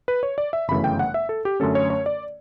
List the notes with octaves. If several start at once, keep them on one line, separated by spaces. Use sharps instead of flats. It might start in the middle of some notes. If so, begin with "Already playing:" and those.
B4
C#5
D5
E5
G1 F#2 C#3 E3 A3 B5
G5
F#5
E5
A4
G4
F#2 D3 A3 C#4 A4
C#5
C#5
D5